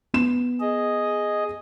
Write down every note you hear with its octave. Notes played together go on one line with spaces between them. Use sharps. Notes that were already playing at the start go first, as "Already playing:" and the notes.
B3 E7
G#4 D#5